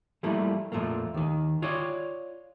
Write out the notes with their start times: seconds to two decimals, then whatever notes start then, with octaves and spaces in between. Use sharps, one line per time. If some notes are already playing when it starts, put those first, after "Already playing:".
0.23 F3 G3 A3 A#3 E4
0.72 F2 A#2 D#3 F3 A3 A#3
1.14 D#2 D#3
1.62 F4 C#5 D5